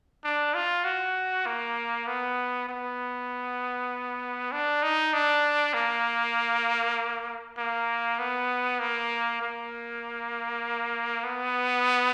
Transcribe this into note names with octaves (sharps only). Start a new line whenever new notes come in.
D4
F4
F#4
A#3
B3
B3
D4
D#4
D4
A#3
A#3
B3
A#3
A#3
B3